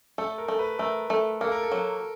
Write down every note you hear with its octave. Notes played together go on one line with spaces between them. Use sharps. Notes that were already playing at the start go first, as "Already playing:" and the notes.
A3 A4
A#4
A3
B4
A3 A#4
A3
A#3 A4
A#4
A4
F#3